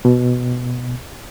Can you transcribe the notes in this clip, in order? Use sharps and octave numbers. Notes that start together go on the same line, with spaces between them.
B2